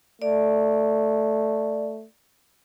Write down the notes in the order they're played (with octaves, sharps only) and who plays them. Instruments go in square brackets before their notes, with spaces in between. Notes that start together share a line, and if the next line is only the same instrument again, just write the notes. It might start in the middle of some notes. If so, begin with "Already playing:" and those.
[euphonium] A3 [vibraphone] D5